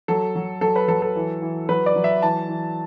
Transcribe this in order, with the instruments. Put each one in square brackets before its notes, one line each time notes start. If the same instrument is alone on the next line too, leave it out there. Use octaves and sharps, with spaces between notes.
[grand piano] F#3 A4
F#3
F#3 A4
B4
F#3 A4
A4
E3
E3
F#3 B4
D5
F#3
E5
E3 A5
E3